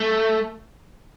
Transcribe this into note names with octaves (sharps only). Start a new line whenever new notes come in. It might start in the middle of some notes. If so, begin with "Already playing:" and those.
Already playing: A3